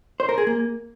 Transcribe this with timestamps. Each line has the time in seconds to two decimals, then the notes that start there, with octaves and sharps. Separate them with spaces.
0.20 C5
0.29 A#4
0.38 G#4
0.47 A#3